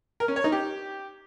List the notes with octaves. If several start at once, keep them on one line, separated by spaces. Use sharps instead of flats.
A#4
C#4
C#5
D#4
G4